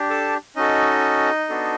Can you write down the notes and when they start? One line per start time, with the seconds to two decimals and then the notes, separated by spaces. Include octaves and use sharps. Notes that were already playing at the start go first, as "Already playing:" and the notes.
Already playing: D4 G4
0.10 A4 A5
0.56 C#4 D#4 F#4 A4 D#5
1.49 B3 D4 F#4 A4